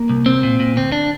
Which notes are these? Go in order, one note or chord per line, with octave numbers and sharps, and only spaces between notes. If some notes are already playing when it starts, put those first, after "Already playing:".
Already playing: A#3
C2
C2 C4
A#2
A#2
D2 C4
D4